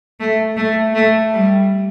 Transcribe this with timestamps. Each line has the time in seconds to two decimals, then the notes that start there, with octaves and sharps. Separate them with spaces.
0.20 A3
0.57 A3
0.95 A3
1.34 G3